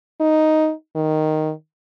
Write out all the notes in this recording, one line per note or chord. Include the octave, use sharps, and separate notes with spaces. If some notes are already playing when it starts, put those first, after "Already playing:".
D#4
D#3